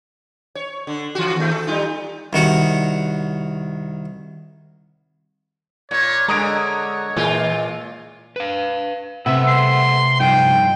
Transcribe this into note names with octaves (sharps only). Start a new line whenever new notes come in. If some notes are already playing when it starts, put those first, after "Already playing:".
C#5
D3
E3 F#4
D#2 A3
A4
G3 D#4 F4
C2 D#3 F#4 F#5
A#2 C#5
D3 G#3 A#4 C#5 A#5 D#6 D7
A#2 E3 G#3 F4
B4 F5
C3 A3 B4 E5 F#5
C6
G2 F3 D#4 G5